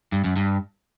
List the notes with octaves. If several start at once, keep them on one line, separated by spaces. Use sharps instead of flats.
G2
F#2
G2